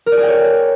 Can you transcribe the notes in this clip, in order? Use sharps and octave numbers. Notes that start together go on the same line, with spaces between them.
A#4
D5
G#4
G5
C#5